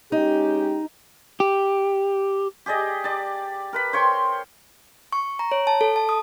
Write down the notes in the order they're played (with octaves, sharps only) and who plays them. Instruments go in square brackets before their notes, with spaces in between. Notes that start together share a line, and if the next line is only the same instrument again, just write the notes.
[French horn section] G#3 C#4 G4 [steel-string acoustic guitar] D#4
[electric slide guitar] G4
[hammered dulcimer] G4 G#4 D5 D#5
D5 A5
A#4 B4 B5
C5 C#5 G5 C6
[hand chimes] C#6
A#5
C#5
A5
A4
A5
D#6